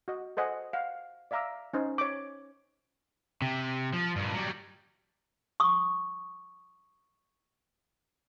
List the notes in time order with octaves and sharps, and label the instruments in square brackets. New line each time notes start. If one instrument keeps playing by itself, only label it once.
[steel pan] F#4 D#5
A4 C5 D#5 F#5 G#5
F5 F#5
D5 E5 F5 A#5 D6 E6
C#4 D#4 C5
C#5 D6
[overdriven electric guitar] C3
F3
G2 A#2
F#3 G3
[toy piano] C#6 D#6